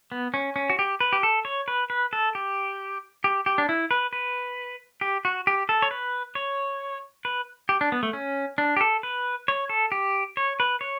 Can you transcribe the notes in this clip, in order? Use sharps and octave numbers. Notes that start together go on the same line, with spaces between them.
B3
C#4
C#4
F#4
G4
B4
G4
A4
C#5
B4
B4
A4
G4
G4
G4
D4
E4
B4
B4
G4
F#4
G4
A4
C#5
B4
C#5
B4
G4
D4
B3
A3
C#4
D4
G4
A4
B4
C#5
A4
G4
C#5
B4
C#5